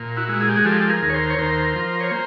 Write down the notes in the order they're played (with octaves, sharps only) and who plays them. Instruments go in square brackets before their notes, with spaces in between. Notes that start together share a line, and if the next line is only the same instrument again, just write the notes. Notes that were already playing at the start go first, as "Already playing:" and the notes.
Already playing: [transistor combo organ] A#2
E4 F#4
G#3
G#4
G4
F#4 G#4
F3 G4 A4
G#4 A#4
D#2
C#5
A#4 C5
C#5
D#2 A#4 C5
F3
C#5
A#3 C5